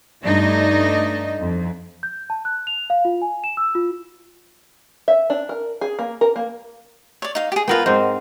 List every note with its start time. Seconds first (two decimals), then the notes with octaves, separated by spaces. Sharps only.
0.24 G2 A3 D4 D#4 D#5
1.40 F2
2.03 G6
2.30 A5
2.45 F#6
2.67 F7
2.90 F5
3.05 F4
3.22 G#5
3.44 E7
3.57 E6
3.75 F4
5.08 E5
5.30 D4
5.49 A#4
5.81 G#4
5.99 A#3
6.21 A#4
6.36 A#3
7.22 C#5 D5
7.35 D#4 F5
7.52 G4 G#4
7.68 B3 F4 A#4 B4 G5
7.86 G#2 C4 D#4 C5